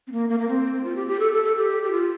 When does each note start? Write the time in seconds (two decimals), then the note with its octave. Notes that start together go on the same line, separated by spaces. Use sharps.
0.07 C4
0.12 A#3
0.29 A#3
0.39 A#3
0.48 C4
0.84 F4
0.96 G4
1.07 G4
1.20 A4
1.31 A4
1.44 A4
1.56 G4
1.83 G4
1.91 F4